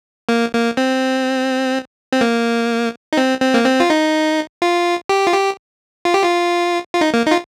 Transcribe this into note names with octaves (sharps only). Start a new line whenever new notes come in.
A#3
A#3
C4
C4
A#3
D#4
C4
C4
A#3
C4
F4
D#4
F4
G4
F4
G4
F4
G4
F4
F4
D#4
A#3
D#4
F4